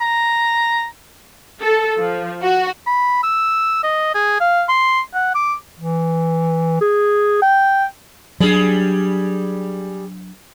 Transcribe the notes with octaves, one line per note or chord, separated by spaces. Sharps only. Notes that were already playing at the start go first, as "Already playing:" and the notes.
A#5
A4
F3
F#4
B5
E6
D#5
G#4
F5
C6
F#5
D6
E3
G#4
G5
F#3 G3 D4 G#4